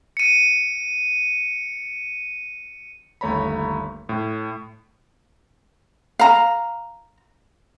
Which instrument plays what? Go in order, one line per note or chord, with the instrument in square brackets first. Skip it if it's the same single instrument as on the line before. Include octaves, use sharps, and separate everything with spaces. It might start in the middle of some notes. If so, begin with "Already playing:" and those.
[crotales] C#7 D#7
[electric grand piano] G1 D#2 A3 C#5 A#5 B5
A2
[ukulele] F5 A#5